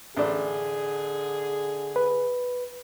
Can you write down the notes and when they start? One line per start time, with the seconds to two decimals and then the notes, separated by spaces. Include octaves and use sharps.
0.17 A1 D3 D4 G#4
1.96 B4